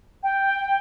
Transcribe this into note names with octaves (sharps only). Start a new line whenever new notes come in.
G5